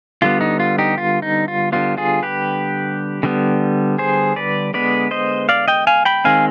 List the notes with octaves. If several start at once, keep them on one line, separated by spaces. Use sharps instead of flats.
D3 G3 B3 F4
D#4
F4
D#4 G4
F4
D#4
F4
D3 G3 B3 F4
F4 G#4
G4 B4
D3 G3 B3
G#4 C5
B4 D5
D3 G#3 B3 B4 D5
C5 D#5
D5 F5
D#5 G5
F5 G#5
G5 B5
D#3 G#3 C4 F5 G#5